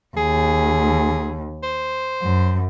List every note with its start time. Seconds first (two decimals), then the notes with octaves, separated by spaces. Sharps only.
0.17 D#2 G#4
1.63 C5
2.22 F#2